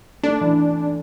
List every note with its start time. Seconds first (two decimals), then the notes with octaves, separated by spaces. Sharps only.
0.24 A3 D4
0.41 E3